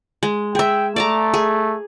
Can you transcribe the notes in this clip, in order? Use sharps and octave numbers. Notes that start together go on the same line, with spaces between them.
G#3
G#4 E5 G5
A3 D5 A5 A#5
G#4